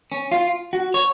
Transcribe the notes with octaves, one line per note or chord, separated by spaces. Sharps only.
C#4
F4
F#4
C#5